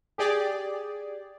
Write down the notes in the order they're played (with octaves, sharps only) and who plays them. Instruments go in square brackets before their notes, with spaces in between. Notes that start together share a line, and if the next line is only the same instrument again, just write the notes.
[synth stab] G4 G#4 D5